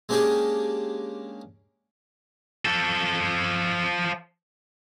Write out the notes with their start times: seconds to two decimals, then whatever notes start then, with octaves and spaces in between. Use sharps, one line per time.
0.09 G#3 A#3 C#4 D4 G4 G#4
2.65 F3 A4